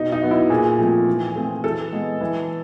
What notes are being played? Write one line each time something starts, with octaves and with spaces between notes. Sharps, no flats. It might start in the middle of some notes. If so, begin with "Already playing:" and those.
Already playing: B2 D#4
D#4
F#3 B3
E4
A#2 G#4
F3 A3 C4
E3
A3 C4
E3 A4
G#3 B3
E3